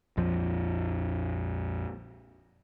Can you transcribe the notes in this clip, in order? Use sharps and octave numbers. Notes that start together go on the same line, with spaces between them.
A#1 F2 F3